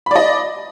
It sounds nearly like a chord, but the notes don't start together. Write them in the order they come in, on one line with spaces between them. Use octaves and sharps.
B5 D5 D#5